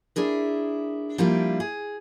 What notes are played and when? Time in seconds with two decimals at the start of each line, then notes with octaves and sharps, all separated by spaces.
0.16 D4 E4 G#4 A#4
1.18 F3 G3 A#3 D4 E4 F4
1.60 G#4